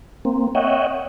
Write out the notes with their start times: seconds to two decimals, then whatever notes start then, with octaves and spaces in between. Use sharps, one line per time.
0.25 A#3 C4
0.55 C#5 D#5 E5 F#5 G5